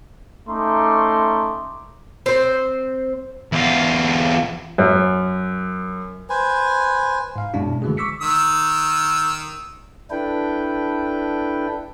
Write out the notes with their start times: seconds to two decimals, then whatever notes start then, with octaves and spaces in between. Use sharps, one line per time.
0.49 A3 C#4 D#4 A#5 C6 D6
2.26 C4 C5
3.52 E2 F4
4.78 F#2
6.30 B4 C5 G#5
7.36 G#2 F5
7.54 F#2 B2 G#3 C#4 D4 E4
7.82 D3 E3 G#3 A3 F#4 G#4
7.97 C#6 D6 E6 B6 C#7
8.21 D#3 E6
10.11 D4 E4 A4 B4 G5